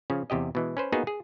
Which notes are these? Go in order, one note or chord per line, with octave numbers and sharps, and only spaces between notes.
C#3 F3 C#4
E2 C3 G4 D#5
B2 E3 G#3
C#4 B4 C5
A#3 B3 D#4 F4 F#4 G#4
G#4